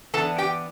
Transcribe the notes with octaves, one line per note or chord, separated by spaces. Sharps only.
E3 B3 D4 A4 A5
G4 G5